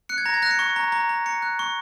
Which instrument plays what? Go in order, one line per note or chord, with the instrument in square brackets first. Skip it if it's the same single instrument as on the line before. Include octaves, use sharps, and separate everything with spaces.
[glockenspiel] F#6 C#7
G#6
A#5 A#6
G#6
F#6 A#6
C#7
C#6
A#5
A#5
A#5
A#5 C#7
F#6
C#6